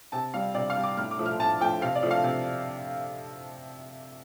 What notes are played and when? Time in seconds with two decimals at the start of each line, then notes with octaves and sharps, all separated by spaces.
0.12 C3 A5
0.34 G3 F5
0.54 C3 D5
0.70 F5
0.76 G3
0.83 D6
0.97 A2 F6
1.11 D6
1.19 F3 A3
1.26 F6
1.39 A2 A5
1.60 F3 A3 G5
1.81 C3 F5
1.95 D5
2.03 F3 A3
2.11 F5
2.24 C3